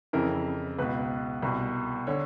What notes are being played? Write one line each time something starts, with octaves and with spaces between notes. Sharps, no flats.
F2 C#3 E3 A#4
C#2 B2 B4
C2 B2
D3 C#5